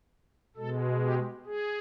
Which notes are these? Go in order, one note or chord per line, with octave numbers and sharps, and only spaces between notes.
B2 G#3 A4
G4
G#4